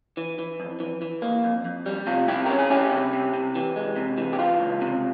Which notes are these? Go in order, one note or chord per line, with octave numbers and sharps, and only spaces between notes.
E3
E3
F2
E3
E3
A#3
F2
F2
G3
C3 F4
C3 E4 G4
C#4 A#4
G#4
C#4 E4 G4
C3
C3
C3
E3
G#3
C3
E3
G4
E3 F4
C#2
C3